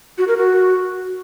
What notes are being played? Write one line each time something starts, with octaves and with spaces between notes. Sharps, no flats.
F#4
A#4
F#4